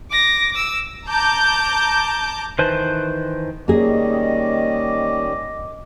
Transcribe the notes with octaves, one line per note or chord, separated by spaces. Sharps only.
D6 A#6
D6 E6
A5 A#5 D6 G6
D#3 E3 B4 C5 A5
D#3 G3 A#3 C#4 G#4 D#5 D6